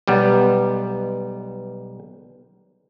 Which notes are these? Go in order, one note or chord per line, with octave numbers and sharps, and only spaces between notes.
B1 G3 B3